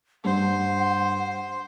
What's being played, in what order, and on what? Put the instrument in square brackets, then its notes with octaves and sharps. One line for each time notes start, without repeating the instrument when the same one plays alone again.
[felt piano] G2 [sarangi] C5 [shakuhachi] F#5